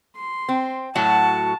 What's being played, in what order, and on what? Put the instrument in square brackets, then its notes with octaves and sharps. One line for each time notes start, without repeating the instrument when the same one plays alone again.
[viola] C6
[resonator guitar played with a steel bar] C4
[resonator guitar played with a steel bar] A2 F#3 F#4 [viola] A5